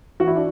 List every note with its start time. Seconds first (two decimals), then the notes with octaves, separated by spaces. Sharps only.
0.20 E3 F#4
0.27 E4
0.36 D4